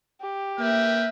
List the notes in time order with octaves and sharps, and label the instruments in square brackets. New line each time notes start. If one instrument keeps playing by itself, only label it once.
[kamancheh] G4
[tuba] A#3 [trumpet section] A#4 B4 G5 [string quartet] E5